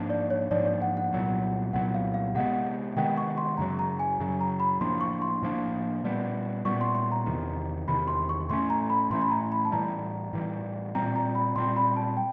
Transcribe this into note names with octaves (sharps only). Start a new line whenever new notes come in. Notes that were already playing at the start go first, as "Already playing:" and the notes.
Already playing: G#2 F3 A#3 D4
D5
C#5
G#2 F3 A#3 D4 D5
D5
F#5
F#5
C2 A#2 F#3 B3
C2 A#2 F#3 B3 F#5
F5
F5
C3 D#3 G#3 B3 F#5
C3 D#3 G#3 B3 G5
C#6
C6
F#2 C#3 F#3 A#5
A#5
G#5
F#2 C#3 F#3
A#5
B5
A2 F3 A#3 D4 C6
C#6
C6
A2 F3 A#3 D4
A#2 G3 B3
A#2 G3 B3 C#6
C6
C6
A#5
E2 C3 D#3
E2 C3 D#3 B5
C6
C#6
A2 E3 A3 C#4 C6
A#5
B5
A2 E3 A3 C#4 C6
B5
A#5
B5
A5
A2 E3 G3 A#5
A2 E3 G3
A#2 G3 C4 A#5
A#5
B5
A#2 G3 C4 C6
B5
A5
G5